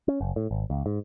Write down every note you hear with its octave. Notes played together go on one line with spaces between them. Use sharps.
C#4
F#1
A2
G#1
C#2
G#2